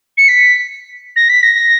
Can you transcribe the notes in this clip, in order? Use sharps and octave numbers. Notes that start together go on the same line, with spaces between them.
C#7
B6
A#6
B6
A#6